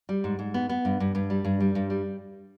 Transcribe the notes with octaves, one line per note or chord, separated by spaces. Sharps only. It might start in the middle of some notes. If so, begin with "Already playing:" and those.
G3
G#2
G#2
B3
B3
G2
G2
G2
G3
G2
G3
G2
G3